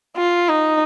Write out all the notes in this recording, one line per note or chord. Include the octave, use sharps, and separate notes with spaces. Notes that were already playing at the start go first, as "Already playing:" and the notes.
F4
D#4